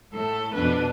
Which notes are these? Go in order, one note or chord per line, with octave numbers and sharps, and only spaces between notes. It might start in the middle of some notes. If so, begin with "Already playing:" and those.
A2 A3 A4
F2 B2 D4 B4